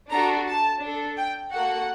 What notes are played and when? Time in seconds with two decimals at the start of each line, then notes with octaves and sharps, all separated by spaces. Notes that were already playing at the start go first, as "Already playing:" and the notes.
0.11 D4 F#4 A4 A#5
0.47 A5
0.81 D4 A4
1.17 G5
1.52 A#3 F#4 A4 F#5